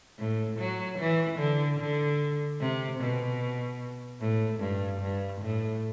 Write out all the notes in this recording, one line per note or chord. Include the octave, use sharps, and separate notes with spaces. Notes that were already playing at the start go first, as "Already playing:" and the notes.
A2
F#3
E3
D3
D3
C3
B2
A2
G2
G2
A2